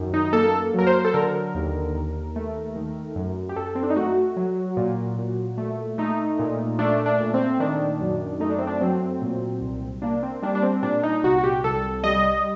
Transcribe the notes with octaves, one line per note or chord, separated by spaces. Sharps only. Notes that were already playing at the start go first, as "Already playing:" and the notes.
Already playing: F#2 D#3
D#4
A#3 A4
F#3 A#4
C5
A4
D3 A#4
D#2
D#2
A3
D#3
F#2
G4
F#2 A4
C4
D4
D#4
A3 F#4
F#3
A#2
A#2
A3
A3 D#4
A#2
A3 D4
D4
A#2
C4
D#3 D4
F#2
A3 D#4
D4
C4
D4
F#3 C4
A#2
C2
A#3 D4
C4
G3 D4
D4
C4
A#2 D4
D#4
C2 F#4
F#4
G4
C2 A4
G3 D#5